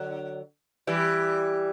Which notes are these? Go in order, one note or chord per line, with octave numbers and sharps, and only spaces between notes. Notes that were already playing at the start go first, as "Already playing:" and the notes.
Already playing: D3 F#3
E3 G3